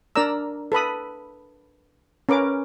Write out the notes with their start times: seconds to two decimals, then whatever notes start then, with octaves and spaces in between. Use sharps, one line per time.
0.16 D4 A#4 D5 A#5 E6
0.72 A4 B4 B5 D#6
2.29 C#4 A#4 B4 D6